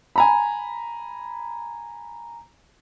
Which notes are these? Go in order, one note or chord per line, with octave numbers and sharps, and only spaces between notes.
G#5 A#5 B5